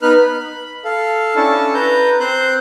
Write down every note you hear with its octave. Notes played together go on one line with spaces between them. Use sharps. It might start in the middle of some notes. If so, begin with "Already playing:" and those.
B3 D#4 B4 F6 F#6
B5
A4 F5
C#4 D4 E4 A4 A5
B4 A#5 G6
C4 C5 F#6 G6